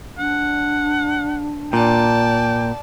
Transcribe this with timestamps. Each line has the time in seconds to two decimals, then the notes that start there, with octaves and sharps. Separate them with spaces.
0.19 D4 F#5
1.73 A#2 D5 G5 A5